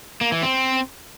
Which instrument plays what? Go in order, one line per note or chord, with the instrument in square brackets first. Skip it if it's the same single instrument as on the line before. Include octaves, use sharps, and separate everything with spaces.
[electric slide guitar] A#3
E3
C4